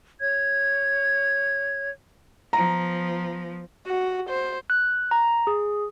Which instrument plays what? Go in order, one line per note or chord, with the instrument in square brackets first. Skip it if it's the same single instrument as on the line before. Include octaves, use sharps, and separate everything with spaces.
[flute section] C#5 G#6
[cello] F3 B3 [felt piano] A#5
[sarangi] F#4
C5
[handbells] F#6
A#5
G#4